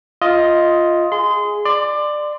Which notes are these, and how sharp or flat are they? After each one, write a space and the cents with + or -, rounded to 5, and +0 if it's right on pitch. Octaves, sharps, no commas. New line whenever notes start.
F4 +0 D#5 +10
G#4 +0 C6 -25
D5 +20 C6 -15